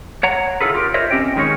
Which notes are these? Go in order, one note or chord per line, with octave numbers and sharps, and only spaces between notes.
C#5 F#5 A#5
D3 E4 F4 G#4 A4 B4
F4 G4 A#4
F4 A#4 C5 C#5 D#5 E5
C4 C#4 G4 D#5 G5
D#3 G#3 C#4 D#4 C#5